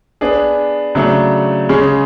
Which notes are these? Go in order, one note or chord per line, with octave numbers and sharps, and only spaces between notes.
B3 D4 G#4
C#3 F#3 A3 D4
C#3 G#3 C#4